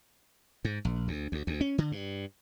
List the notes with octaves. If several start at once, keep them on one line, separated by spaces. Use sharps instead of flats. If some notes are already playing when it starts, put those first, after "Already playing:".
G#2
A#1
D2
D2
D2
C#4
D3
G2